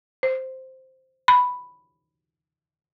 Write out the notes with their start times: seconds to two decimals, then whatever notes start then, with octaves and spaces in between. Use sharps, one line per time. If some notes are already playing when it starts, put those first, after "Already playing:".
0.23 C5
1.28 B5